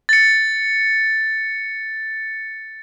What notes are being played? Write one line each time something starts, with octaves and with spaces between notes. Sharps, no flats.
A6 C#7